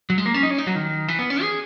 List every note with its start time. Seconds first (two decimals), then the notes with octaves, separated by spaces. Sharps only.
0.10 F#3
0.18 G#3
0.26 A#3
0.34 C#4
0.43 D#4
0.51 C#4
0.58 D#4
0.67 F#3
0.75 D#3
1.08 E3
1.19 B3
1.30 C#4
1.42 G#4